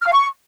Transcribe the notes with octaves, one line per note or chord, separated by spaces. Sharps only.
F6
F5
C#6